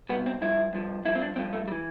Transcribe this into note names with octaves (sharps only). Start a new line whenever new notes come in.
C2 B2 B3
C4
G2 F3 E4
G2 F3
G2 F3 E4
C4
D4
G2 F3 C4
A3
G3
E3